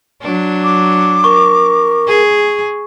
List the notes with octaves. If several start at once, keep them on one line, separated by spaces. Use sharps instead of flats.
F#3 D4
D6
A#4 C#6
G#4